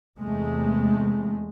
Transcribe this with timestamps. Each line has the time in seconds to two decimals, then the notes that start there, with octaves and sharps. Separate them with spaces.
0.20 E2 C3 G#3 A3